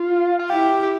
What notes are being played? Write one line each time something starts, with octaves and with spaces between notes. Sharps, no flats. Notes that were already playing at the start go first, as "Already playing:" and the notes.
Already playing: F4
F4
E4 G4
G4